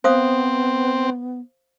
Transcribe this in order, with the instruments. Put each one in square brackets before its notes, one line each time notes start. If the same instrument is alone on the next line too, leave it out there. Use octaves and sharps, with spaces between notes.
[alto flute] B3 [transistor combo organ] C4 [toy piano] C5 F5 D#6